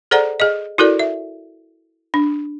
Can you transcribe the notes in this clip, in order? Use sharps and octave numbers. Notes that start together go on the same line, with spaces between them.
G#4 A4 C5 D5 F#5 A#5
G#4 D#5
E4 F#4 A4 A#4 D5
E5
D4